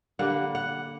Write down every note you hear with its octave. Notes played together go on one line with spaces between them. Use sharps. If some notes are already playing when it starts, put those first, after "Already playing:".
D3 G3 A#3 F#5
F#5